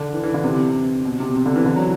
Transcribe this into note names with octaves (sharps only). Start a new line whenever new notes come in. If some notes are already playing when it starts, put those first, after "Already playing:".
Already playing: D3
E3
E3
D3
C3
B2
C3
C3
D3
E3
D3
F#3